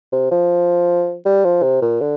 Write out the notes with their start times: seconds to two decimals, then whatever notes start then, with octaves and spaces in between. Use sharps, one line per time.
0.12 C3
0.31 F3
1.25 G3
1.44 F3
1.62 C3
1.82 A#2
2.01 D3